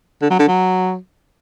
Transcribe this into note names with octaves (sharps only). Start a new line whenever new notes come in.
D3
F#3
D3
F#3